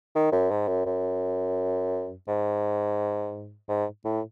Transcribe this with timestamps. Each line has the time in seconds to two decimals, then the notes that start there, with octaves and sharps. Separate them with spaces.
0.15 D#3
0.32 F#2
0.51 G#2
0.68 F#2
0.86 F#2
2.28 G#2
3.69 G#2
4.05 A2